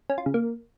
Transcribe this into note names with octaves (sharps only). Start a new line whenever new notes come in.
C#4
F4
C#3
A#3